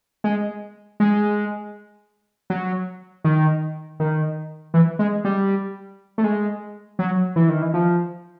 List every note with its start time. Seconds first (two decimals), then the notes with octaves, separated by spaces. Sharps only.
0.24 G#3
1.00 G#3
2.50 F#3
3.24 D#3
4.00 D#3
4.74 E3
4.99 G#3
5.25 G3
6.18 A3
6.24 G#3
6.99 F#3
7.36 E3
7.49 D#3
7.62 E3
7.74 F3